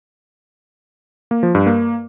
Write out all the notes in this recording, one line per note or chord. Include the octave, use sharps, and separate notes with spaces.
A#3
F3
G2
A#3